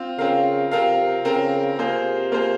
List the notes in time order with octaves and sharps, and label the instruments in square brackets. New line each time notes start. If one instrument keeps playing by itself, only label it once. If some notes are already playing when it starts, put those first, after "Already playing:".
Already playing: [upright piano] C4 F4
[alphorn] C#3 [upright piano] C4 F4 A#4 F5
[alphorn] C3 [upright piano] C4 F4 A#4 F5
[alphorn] C#3 [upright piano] C4 F4 A#4 F5
[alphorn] C3 [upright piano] A#3 F4 G#4 C5
[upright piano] A#3 F4 G#4 C5